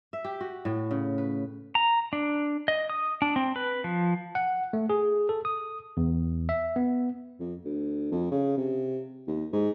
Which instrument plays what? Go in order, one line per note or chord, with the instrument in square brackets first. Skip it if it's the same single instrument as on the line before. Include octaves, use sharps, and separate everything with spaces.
[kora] E5
G4
F#4
A2
C#3
B4
[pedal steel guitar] A#5
D4
D#5
D#6
D4
C4
B4
F3
[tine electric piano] F#5
A3
G#4
A4
D#6
E2
E5
B3
[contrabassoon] F2
D2
F2
C#3
C3
D#2
G#2